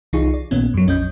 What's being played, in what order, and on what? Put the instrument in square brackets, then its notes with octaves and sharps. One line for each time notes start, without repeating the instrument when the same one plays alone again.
[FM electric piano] C2 E3 D#4 F4 G#4 C#6
D5
A#1 A#2 D#3 B3 C#4
F#2 F#3
A#1 F2 C#4 D#5 G6